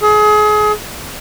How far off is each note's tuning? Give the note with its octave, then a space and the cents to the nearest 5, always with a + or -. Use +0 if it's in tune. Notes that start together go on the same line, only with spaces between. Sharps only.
G#4 +30